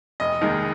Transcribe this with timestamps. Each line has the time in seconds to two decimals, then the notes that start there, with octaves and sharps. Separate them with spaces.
0.20 F1 D#5
0.41 D#2 D#3 G#3 A#4